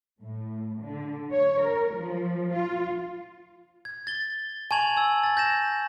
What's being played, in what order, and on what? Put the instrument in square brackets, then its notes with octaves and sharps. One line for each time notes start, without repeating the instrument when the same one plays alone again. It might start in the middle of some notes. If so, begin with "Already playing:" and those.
[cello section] A2
D3
C#5
A#4
F3
F4
[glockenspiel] G#6
A6 G7
G#5 A5 C#6 G#6 F7 F#7
G#5 E6 G#6
G#6 A6
G6 A#6 E7